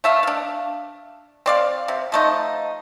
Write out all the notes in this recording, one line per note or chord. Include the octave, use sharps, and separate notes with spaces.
A3 E5 F5
D4 F5
C4 D5 F5
C3
F3 A3 D#4